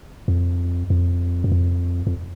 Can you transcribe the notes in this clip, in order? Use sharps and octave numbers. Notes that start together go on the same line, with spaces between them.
F2
F2
F#2
F2
F2